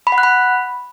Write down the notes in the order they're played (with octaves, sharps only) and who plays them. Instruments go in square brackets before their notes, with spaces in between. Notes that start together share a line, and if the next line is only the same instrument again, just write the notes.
[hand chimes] B5
F#5
F#6
B5